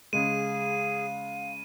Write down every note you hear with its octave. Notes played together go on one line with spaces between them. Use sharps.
C#3 G#3 G#4 F5 D#7